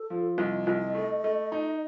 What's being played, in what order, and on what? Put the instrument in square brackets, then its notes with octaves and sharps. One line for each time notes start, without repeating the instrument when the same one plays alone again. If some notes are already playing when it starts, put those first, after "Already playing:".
Already playing: [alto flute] A4
[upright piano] F3
[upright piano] C2 [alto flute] D#5
[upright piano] C2
A3
A3
D#4